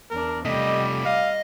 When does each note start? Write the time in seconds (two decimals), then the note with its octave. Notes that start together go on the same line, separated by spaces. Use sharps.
0.10 E2 D4 A#4
0.45 C3 G3 A3 D#5
1.05 D#5 F5